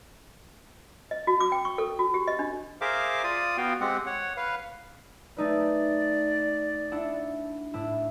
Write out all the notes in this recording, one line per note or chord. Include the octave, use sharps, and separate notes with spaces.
D#5
F#4
D6
G5
C#6
A4
F#4
G4
D#5
D4
G#4 A#4 C5 E5 F5 D6
F4 D5 D#6
B3 F#4 F5 G5
G#3 C4 G4 F#5
C#5 F#5
B4 F5
A3 D#4 B4 D5
D4 E4 F#5
A2 D4 E4